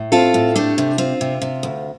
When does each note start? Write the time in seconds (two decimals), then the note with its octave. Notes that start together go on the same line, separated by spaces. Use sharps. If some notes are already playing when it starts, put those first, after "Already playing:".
Already playing: A2
0.12 C4 F4 A4
0.34 A2
0.56 A3 D4 G4
0.78 C3
0.98 C4 F4
1.21 C3
1.42 C3
1.63 D2